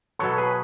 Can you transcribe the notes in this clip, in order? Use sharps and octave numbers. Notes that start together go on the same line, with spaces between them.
B2 F#3 B3 A4 C#5
G#4 B4